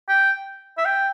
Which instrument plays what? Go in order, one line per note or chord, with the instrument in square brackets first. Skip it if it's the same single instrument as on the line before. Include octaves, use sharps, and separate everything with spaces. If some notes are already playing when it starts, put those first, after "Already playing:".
[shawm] G5
E5
G5